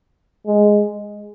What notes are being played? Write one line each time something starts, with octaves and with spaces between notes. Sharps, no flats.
G#3